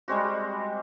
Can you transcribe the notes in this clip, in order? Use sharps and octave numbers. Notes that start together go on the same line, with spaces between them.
G3 G#3 C4 F#4